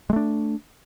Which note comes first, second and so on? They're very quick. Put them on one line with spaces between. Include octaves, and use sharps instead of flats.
G#3 A3 D4